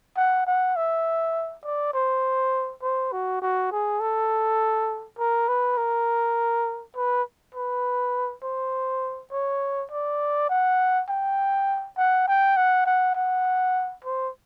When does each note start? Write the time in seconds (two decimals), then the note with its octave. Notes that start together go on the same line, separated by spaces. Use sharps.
0.17 F#5
0.47 F#5
0.76 E5
1.65 D5
1.94 C5
2.83 C5
3.12 F#4
3.42 F#4
3.72 G#4
4.00 A4
5.18 A#4
5.48 B4
5.78 A#4
6.96 B4
7.55 B4
8.43 C5
9.32 C#5
9.92 D5
10.49 F#5
11.09 G5
11.97 F#5
12.28 G5
12.57 F#5
12.86 F#5
13.15 F#5
14.05 C5